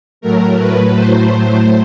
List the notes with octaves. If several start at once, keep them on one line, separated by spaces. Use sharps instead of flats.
A2 F#3 A3 A#4
B4
A2 F#3 A3 C5